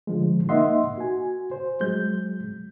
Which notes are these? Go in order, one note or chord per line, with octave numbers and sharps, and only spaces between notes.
D3 F3 G#3
A#3 D#4 D#5 E5 F#5 C6
F#4 G#5
C5
F#3 G#3 G6